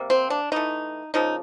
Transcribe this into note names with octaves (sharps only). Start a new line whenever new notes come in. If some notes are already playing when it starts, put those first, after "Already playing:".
Already playing: C3 G3 A#3
C4
D4
E3 A3 D#4
C#3 F3 A#3 D#4